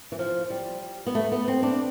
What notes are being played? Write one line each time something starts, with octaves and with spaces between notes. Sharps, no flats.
E3
F3
G3
B3
A3
B3
C4
D4